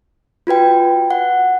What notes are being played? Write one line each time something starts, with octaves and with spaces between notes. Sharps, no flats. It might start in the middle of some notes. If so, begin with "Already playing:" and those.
F4 F#4 B4 G5
F#5